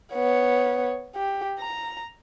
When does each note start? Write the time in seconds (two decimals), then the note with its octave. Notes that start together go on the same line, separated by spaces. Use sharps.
0.14 B3 C#5
1.16 G4
1.59 A#5